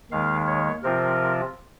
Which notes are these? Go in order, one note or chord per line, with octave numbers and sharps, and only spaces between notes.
D#2 D#3 G#3 F5
C#5
C3 F3 C4 F4 A#4